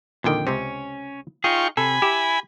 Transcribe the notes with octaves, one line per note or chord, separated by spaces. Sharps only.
F2 A#2 D3 D#3 G5
C#2 C3 C4 C#4
D#4 F4 G#4 G5 C#6
C3 A4 G#5 B5
E4 G4